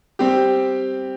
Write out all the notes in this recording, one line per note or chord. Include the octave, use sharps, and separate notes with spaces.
G3 C4 G4